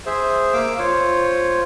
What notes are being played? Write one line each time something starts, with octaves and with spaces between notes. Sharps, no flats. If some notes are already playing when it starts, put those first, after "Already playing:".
G#4 C5 E5
A#3 F5 D6 E6
F4 C5 C#5